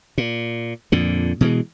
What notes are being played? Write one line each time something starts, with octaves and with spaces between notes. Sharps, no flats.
A#2
F2 A#2 D3
B2 E3 G#3